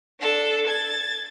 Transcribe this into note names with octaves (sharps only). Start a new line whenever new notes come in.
D4 A4
G#6 A6